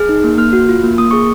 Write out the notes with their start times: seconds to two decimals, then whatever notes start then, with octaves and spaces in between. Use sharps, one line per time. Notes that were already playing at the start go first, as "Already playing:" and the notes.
Already playing: G#4 F6
0.09 D#4
0.24 A#3
0.38 A#3 F6
0.53 F#4
0.69 F4
0.83 A#3
0.98 A#3 D#6
1.11 G#4 C#6